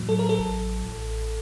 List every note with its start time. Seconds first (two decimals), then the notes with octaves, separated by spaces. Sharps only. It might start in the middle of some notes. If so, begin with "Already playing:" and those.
Already playing: A2 F#3
0.09 A4
0.19 A#4
0.29 A4
0.39 A1
0.85 A1